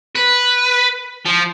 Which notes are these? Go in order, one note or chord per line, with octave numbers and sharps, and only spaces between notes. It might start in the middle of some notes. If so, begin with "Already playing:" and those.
B4
F3